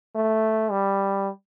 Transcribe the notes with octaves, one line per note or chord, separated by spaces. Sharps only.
A3
G3